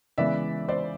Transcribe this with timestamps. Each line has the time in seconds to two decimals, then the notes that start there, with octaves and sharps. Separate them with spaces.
0.18 C#3 E3 G#3 B3 D5 E5
0.68 C5 D5